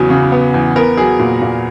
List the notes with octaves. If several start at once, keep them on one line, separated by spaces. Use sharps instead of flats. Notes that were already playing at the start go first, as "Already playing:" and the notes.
Already playing: E2 C#3 F#3 B3
C#3
B3
E2
B3 A#4
F#3 G#4
A#2
A#2